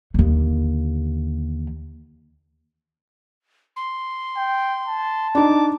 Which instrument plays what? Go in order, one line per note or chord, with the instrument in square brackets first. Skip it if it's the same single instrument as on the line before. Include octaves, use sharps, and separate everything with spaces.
[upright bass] D#2 D3
[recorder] C6
[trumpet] G5
A5
[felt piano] D4 D#4 [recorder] D6